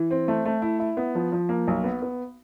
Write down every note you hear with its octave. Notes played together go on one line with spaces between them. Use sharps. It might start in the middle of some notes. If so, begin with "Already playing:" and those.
Already playing: E3
C4
A3
A3
E4
E4
B3
F3
F3
A#3
B1
B3
B3